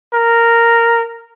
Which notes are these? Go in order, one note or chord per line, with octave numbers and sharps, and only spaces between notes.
A#4